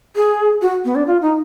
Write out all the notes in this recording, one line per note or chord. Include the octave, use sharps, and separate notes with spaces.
G#4
F#4
B3
D4
F4
D#4